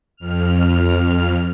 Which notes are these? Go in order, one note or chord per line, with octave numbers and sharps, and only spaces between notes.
F2 F6